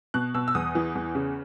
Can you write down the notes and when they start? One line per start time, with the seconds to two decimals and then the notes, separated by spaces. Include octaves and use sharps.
0.14 B2 F#6
0.34 B2 E6
0.48 E6
0.55 E2 D#6
0.75 E3
0.95 E2
1.15 C#3